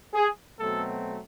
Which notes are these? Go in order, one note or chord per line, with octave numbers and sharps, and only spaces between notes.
G#4
B2 F#3 A3 C4 A4